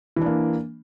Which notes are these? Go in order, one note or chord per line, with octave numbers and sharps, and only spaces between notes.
E3 A#3 D4